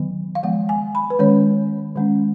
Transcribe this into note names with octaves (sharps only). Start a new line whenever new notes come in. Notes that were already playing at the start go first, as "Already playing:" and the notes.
Already playing: D#3 F#3 B3
F5
F3 G#3 B3 F#5
G#5
B5
B4
D#3 G#3 C#4 C#5
D#3 G#3 C#4